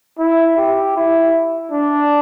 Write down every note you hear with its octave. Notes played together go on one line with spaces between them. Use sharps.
E4
G4
E4
D4